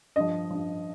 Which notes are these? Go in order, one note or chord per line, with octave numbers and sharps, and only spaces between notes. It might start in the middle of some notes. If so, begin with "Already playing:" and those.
G2 F3 D#5
G2 F3